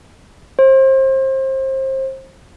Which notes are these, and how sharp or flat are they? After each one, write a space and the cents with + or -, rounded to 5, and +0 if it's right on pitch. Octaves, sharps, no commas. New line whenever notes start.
C5 +30